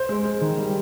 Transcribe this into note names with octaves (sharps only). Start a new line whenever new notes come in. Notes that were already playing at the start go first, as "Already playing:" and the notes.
Already playing: C5
G#3
G#3
D#3
G3